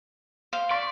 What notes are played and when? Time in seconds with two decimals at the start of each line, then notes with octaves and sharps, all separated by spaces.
0.53 C5 F5
0.71 D5 C6 C#6 B6